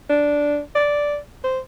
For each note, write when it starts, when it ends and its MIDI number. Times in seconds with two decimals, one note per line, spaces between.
0.10 0.60 62
0.75 1.17 74
1.44 1.59 72